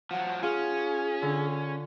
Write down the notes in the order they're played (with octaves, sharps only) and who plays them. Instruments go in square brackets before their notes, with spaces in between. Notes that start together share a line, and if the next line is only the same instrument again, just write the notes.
[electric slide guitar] F3 F#3 [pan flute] F#5
[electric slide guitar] C#4 [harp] F4 [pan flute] G#4
[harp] D3